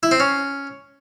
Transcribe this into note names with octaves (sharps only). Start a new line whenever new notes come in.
E4
C4
C#4